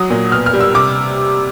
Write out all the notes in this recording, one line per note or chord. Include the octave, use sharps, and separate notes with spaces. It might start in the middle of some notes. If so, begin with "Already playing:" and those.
Already playing: F#3 D#6
A#2
B2 F6
F6
G3
E6
C3 D6